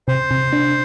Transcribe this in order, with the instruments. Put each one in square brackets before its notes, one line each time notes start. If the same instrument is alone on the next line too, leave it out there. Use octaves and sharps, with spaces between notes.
[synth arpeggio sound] C3 [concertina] C5
[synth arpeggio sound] C3
D4